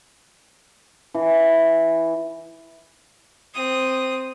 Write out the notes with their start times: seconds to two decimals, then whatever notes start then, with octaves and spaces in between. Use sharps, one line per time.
1.14 E3
3.55 C4 D#6